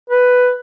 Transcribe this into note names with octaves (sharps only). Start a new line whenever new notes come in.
B4